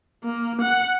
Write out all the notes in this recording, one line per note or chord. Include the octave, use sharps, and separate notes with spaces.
A#3
F#5